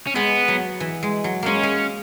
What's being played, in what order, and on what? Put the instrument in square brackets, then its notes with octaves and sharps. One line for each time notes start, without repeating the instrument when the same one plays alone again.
[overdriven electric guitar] C#4
[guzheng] G#3 [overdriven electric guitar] B3
[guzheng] F#3
E3
G#3
F#3
[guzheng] G#3 A#3 [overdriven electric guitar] C#4
[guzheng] G#3